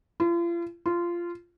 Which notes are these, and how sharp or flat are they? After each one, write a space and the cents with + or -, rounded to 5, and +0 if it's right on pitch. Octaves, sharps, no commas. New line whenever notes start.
F4 -40
F4 -15